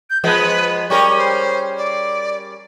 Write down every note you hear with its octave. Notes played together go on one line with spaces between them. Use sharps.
G6
F3 G#3 B3 B4
G3 C#4 A#4 C#6
C5
D5